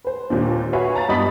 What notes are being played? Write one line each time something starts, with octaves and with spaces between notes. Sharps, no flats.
B4 C5
D#2 A#2 D4
F#4 B4 C#5 E5 F5 G#5
A5 A#5 A6
G2 B3 D#5 B5 D#6 B6